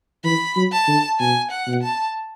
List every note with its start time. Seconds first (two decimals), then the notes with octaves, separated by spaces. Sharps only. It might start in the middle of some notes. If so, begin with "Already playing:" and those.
0.24 E3 B5
0.56 F#3
0.72 A5
0.88 D3
1.20 B2 G#5
1.51 F#5
1.67 B2
1.83 A5